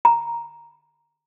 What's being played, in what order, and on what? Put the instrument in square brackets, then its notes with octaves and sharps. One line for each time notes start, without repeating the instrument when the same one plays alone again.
[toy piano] A#5